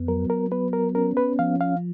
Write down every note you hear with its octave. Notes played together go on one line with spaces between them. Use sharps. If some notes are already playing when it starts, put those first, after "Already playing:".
Already playing: F2 B3
F#3 A#4
A#4
B3 B4
A#4
C#4 A#4
B4
F3 F5
F5